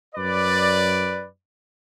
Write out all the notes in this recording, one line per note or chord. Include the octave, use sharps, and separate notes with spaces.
F#2 B4 D5